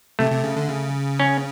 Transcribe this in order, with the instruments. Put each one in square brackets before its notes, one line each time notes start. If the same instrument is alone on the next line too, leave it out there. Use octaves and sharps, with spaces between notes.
[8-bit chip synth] C3 [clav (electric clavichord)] A3
[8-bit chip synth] C3
C#3
D3
C#3
[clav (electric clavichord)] C#4